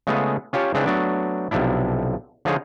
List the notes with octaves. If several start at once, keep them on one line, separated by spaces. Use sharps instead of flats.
C#3 G#3 A3 B3 F4 G#4
C#4 F4 G4 C#5 A5
C#3 G#3 C4 D4 E4 B4
F#3 A3 B3 D4
B1 C3 F3 D4 E4
D3 F3 D#4 F4 G#4 C#5